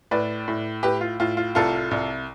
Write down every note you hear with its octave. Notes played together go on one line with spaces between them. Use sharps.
A2 B4 D5
A2
A2 G4 B4
F4
A2 F4
F4
C2 F4 A4
C2